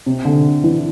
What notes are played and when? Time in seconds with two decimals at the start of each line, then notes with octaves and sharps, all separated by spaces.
0.06 C3
0.25 D3
0.64 E3